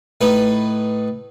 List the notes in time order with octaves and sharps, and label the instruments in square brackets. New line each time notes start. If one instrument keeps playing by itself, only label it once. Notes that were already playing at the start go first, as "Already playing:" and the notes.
[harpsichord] A2 D#4 B4